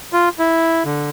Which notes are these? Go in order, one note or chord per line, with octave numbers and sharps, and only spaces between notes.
F4
E4
D3